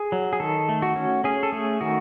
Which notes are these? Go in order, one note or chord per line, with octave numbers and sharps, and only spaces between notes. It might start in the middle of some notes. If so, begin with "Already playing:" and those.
Already playing: G#4
F#3
G#4
D#3 A4
A3
F#4
C#4
C#4 G#4
A4
A3 G#4
D#3 F#4